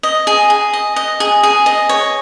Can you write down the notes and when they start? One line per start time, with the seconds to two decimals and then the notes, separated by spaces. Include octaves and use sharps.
0.03 D#5
0.27 G#4
0.50 G#4
0.73 D#5
0.96 D#5
1.20 G#4
1.43 G#4
1.66 D#5
1.89 C#5